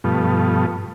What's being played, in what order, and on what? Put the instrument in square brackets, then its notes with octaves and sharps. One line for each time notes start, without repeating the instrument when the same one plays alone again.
[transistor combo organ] G2 B2 F3 A3